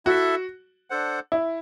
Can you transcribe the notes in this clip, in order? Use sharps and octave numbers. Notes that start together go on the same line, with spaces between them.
E4 F#4 A4 E5
D4 A4 C5 F#5
E4